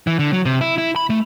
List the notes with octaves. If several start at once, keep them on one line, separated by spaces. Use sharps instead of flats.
E3
D3
F#3
C3
E4
E4
B5
A3